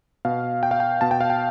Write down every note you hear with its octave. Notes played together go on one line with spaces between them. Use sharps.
B2 F5
G5
F5
G5
B2 A5
G5
F5
G5